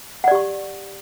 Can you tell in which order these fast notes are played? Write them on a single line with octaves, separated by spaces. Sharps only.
F#5 D5 G4 C#6